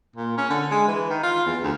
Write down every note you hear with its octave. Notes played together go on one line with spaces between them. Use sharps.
A#2
C#4
D3
G#3
E3
D#3
F4
E2
D2